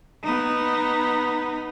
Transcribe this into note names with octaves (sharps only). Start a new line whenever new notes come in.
B3 D#4